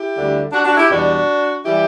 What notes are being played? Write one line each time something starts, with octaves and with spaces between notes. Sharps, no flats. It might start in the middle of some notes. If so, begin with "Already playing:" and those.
Already playing: E4 G4
D2 D3 G3
D4 F#4
D4 F#4
E4 G4
E2 B2 G3 D4 F#4
E3 G3 E4 G4